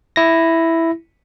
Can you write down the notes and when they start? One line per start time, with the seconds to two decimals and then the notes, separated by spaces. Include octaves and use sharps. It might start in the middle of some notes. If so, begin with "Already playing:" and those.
0.16 E4 A#6